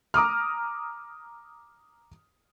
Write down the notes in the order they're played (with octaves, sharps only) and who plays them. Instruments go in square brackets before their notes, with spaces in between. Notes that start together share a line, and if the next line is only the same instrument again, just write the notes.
[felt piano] A#5 D6 D#6 F6